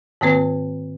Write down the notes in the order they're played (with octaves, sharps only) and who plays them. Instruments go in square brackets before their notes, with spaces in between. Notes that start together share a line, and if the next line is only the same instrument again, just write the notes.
[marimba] G#2 D#3 A#3 C4 B4